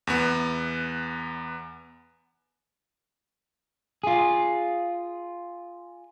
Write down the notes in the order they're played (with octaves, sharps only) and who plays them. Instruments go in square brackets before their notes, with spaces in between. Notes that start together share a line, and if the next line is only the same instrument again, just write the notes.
[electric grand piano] E2 B3
[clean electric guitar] F4 G#4